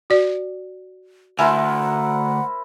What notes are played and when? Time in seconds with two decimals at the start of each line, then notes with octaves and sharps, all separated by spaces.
0.10 F#4 D5
1.39 D2 E4 A#4 C5 F#5 G#5